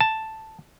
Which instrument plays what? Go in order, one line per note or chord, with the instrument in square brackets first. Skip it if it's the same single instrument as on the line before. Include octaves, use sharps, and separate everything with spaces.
[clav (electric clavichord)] A5